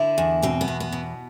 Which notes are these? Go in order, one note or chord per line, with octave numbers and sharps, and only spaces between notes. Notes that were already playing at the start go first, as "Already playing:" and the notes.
Already playing: D3 E4
E2
B2 C4
B3
E2
B3
B2